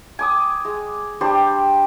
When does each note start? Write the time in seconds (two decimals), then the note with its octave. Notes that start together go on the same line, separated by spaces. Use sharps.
0.19 G#5 D6 D#6
0.65 G#3
1.21 G3 D4 G4 C5